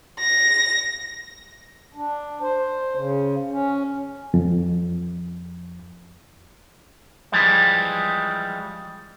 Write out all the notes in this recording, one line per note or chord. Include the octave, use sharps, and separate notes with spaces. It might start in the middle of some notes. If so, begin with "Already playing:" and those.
A#6
D4
C5
C#3
C#4
F2
E3 F3 G3 G#3